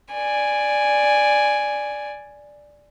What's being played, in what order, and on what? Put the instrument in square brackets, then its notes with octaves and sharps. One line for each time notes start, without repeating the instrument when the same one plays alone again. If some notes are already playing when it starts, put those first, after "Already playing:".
[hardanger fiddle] D5 G#5